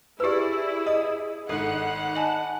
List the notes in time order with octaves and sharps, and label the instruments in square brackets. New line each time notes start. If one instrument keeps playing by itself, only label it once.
[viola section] E4 G#4 [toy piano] G4 B4 [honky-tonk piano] D5 E6
[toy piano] D#5 [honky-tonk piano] D#6
[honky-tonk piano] G#1 G#2 [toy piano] A4 D#6 [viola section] F#5
[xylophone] D#5 G#5 A5